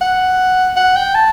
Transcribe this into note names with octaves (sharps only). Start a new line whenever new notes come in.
F#5
F#5
G5
A5